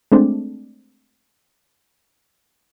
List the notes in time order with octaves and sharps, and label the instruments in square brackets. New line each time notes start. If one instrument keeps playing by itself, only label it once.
[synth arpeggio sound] G#3 A3 C4 D4